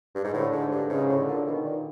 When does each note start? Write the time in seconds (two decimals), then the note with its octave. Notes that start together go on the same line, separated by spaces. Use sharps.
0.15 G2
0.24 G#2
0.33 A2 D3
0.52 G#2
0.71 G2
0.90 G#2 C#3
1.09 A2
1.18 D3
1.28 A#2
1.47 B2 D#3
1.65 A#2